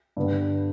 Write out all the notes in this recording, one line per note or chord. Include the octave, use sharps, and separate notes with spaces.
G2 D3 G3 B3